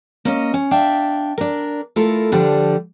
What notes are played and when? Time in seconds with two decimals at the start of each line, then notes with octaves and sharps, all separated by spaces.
0.25 A#3 C#4 D#5
0.54 C#4
0.71 D4 E5 F5 G5
1.38 D4 A#4
1.96 A3 E4 F4 A4 A#4
2.32 D3 F3 G3 D4